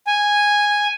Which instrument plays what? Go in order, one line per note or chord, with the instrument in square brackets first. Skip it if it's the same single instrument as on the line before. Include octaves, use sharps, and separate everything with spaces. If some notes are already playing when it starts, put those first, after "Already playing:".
[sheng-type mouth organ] G#5